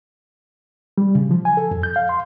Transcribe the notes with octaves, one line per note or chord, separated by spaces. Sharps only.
G3
C#3
F3
G#5
A4
F2
G6
F5
C6